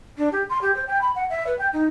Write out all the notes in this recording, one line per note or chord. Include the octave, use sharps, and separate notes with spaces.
D4
G4
C6
G4
C5
G5
B5
F#5
E5
B4
G5
D#4